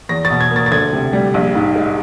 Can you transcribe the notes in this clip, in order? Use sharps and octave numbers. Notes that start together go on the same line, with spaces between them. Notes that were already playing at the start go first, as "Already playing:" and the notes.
E2 A#6
A6
B2
G#6
A#3
A6
A6
D2 G#6
C3
G3
A#1
G#2
G#3